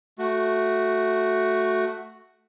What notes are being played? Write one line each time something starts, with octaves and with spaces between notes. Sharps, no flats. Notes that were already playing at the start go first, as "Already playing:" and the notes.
A3 F#4